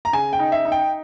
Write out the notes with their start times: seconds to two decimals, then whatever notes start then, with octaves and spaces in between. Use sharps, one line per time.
0.05 A#5
0.13 C#3 G#5
0.33 G5
0.39 D#4
0.52 E5
0.65 D#4
0.72 G5